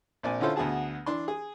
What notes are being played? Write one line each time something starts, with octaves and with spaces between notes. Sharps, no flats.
A#1 C4 D5 G#5
D3 C#4 E4 F4 A4 C5
D2 B3 F#4 G#4 A5
E3 D4 C6
G#4